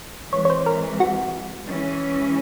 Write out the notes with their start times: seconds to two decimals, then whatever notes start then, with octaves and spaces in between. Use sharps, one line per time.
0.33 E3 G#3 C4 C#5
0.45 C#5
0.50 C5
0.66 A#4
1.00 F#4
1.68 E3 G#3 C#4